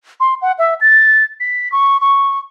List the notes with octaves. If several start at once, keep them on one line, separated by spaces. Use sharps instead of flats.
C6
F#5
E5
A6
B6
C#6
C#6